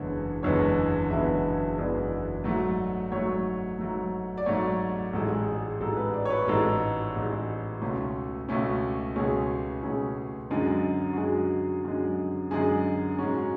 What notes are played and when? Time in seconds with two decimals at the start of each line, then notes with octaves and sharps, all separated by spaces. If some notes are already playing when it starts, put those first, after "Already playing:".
Already playing: F#1 E2 D3 G#3 B3 C#5
0.43 F#1 E2 D3 G#3 B3 C#5
1.10 F#1 E2 D3 G#3 B3 E5
1.77 F#1 E2 D3 G#3 B3 D5
2.44 G#2 F#3 A3
3.12 G#2 F#3 A3 C#5
3.79 G#2 F#3 A3
4.37 D5
4.46 G#2 F#3 A3 C#5
5.13 A1 G#2 G#3 A4
5.35 G#4
5.57 G#4
5.80 A1 G#2 G#3 A4
5.97 B4
6.14 D5
6.25 C#5
6.30 B4
6.47 A1 G#2 G#3 A4
7.15 A1 G#2 G#3
7.81 C#2 B2 A3 C#4
8.49 C#2 B2 A3 C#4
9.16 C#2 B2 A3 C#4 G#4
9.83 C#2 B2 A3 C#4 G#4
10.51 F#2 D3 G#3
11.13 F#4
11.17 F#2 D3 G#3 G#4
11.85 F#2 D3 G#3
12.51 F#2 D3 G#3 G#4
13.18 G#2 G#3 C#4 F#4